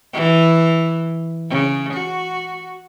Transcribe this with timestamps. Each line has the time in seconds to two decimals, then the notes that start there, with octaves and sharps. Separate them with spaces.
0.13 E3
1.50 C#3
1.93 F#4